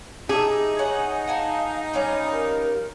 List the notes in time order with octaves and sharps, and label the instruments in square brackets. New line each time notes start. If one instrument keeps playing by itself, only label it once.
[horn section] D#4 [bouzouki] G4 E5 [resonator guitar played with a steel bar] G#4
[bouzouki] C#5 F#5 [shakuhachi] G#5
[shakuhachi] F5 [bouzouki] F#5 G#5 A5
[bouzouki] G3 C#4 F4 [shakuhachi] G#5
[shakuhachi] A#4